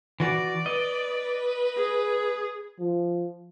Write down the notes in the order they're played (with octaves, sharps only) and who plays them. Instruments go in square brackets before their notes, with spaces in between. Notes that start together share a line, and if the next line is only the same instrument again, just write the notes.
[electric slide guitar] E3 F#4 [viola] D5
[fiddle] B4 [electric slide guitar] D#5
[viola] G#4
[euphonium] F3